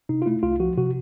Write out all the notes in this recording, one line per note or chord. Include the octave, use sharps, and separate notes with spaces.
C3 D#4
F4
A3 E4
C2 F4
F3 F#4
C3 F#4